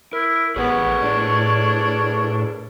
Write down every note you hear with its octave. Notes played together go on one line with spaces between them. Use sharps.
E4 A#4
A1 B3 G#4 A#4 B4 C#5
A2 D4